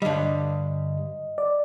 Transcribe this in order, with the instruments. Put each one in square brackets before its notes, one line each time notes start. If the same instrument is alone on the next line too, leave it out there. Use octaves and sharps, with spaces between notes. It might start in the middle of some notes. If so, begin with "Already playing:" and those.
[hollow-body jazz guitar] G2 D3 G3 [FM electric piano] D#5
[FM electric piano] D5